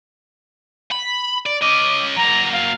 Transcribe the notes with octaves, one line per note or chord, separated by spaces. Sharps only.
B5
D5
C#4 D#5 D6
F#3 A#3 A#5
F5